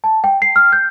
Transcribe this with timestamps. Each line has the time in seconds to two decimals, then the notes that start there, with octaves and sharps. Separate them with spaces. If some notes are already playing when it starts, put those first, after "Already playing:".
0.04 A5
0.24 G5
0.42 C7
0.56 F6
0.72 G6